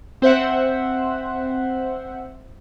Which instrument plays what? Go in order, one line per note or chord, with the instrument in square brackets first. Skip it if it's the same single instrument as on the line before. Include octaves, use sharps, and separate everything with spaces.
[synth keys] C4 C5 E5 F#5